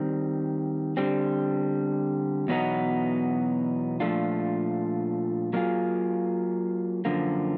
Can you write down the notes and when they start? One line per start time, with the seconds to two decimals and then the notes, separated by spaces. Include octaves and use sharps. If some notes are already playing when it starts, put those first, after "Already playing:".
Already playing: D#3 G3 C4
0.97 D3 G3 C4
2.48 E2 B2 F#3 B3 D#4
4.00 A#2 F3 A3 D4 F4
5.53 F#3 A#3 D4 F4 G#4
7.05 F#2 D3 F3 A#3